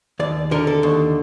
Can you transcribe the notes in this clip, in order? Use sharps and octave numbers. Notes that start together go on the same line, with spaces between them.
D#2 D5
D3 A#4
A4
D#2